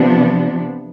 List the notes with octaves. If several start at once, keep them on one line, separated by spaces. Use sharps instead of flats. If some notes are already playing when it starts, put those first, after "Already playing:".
Already playing: C3 F3 B3 D4